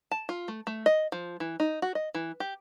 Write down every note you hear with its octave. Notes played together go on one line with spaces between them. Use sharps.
A5
F4
A3
A3
D#5
F3
E3
D#4
F#4
D#5
E3
G4